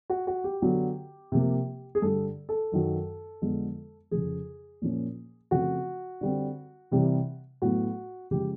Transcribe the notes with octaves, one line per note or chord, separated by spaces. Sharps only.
F#4
F#4
G4
D3 F#3 B3
C3 F3 A#3
G#4
G2 D3 G3 A4
A4
F#2 D#3 F#3
F2 D3 F3 G#3 B3
F2 C#3 F3 G#4
A#2 F3 A#3 C#4
C#3 F3 A3 C4 F#4
D3 G3 C4
C3 E3 G3 C4
A2 F#3 B3 F#4
C#3 F3 G#3 G4